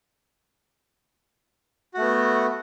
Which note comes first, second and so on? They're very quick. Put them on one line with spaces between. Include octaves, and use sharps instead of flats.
F#4 A3 B3